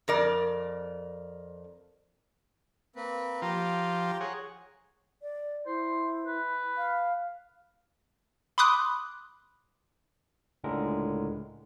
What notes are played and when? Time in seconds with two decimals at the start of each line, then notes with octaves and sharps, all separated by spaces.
0.08 F2 A#4 D5
2.96 A#3 C4 B4
3.42 F3 F4 G4 G5 A#5
4.20 G#4 C#5 F#5
5.22 D5
5.66 E4 C5
6.26 B4
6.77 F5
8.58 B5 C6 D6 D#6 F#6
10.64 C#2 A2 D3 G#3 A#4